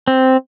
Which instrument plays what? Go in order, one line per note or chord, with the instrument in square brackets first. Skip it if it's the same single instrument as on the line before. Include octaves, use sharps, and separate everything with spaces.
[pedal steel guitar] C4